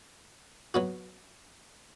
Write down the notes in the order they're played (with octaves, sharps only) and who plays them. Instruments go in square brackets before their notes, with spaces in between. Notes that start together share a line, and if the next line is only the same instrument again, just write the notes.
[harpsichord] F#3 B3 F#4